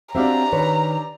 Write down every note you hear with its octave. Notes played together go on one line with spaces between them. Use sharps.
C4 D4 F#4 G4 E5 F5 A#5
D#3 B4 C#5